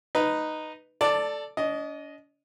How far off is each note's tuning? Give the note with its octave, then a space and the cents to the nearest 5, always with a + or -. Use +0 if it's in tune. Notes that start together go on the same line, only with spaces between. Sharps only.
D#4 -5 B4 +0
A4 +0 D5 +0 A5 +20
D4 -45 D#5 +0